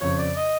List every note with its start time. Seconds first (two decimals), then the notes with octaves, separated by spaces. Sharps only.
0.01 F2 C#3 F3 C#5
0.18 D5
0.36 D#5